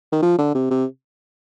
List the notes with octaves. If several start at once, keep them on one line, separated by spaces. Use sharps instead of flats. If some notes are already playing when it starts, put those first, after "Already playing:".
D#3
F3
D3
C3
C3